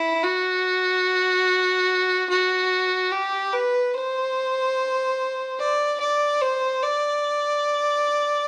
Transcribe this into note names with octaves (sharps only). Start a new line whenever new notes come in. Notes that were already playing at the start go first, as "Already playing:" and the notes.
Already playing: E4
F#4
F#4
G4
B4
C5
D5
D5
C5
D5